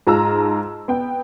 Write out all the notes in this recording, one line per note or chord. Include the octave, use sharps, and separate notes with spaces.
G#2 F4 A5 A#5 E6
B3 G5